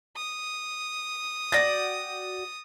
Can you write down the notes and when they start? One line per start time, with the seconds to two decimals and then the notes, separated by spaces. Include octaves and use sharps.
0.16 D#6
1.52 F#4 D5 G5 A6 A#6